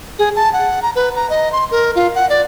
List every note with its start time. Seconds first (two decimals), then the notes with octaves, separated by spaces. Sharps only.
0.19 G#4
0.36 A5
0.53 F#5
0.82 A#5
0.96 B4
1.16 A#5
1.30 D#5
1.52 C6
1.71 A#4
1.96 F4
2.15 F#5
2.29 D5